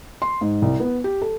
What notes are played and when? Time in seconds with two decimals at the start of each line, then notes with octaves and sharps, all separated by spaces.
0.22 C6
0.41 G#2
0.62 C2
0.80 B3
1.04 G4
1.22 A4